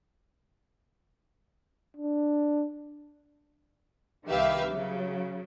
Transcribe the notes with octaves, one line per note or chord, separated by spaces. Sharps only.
D4
C2 D#3 G4 B4 E5 F5
C#3 F#3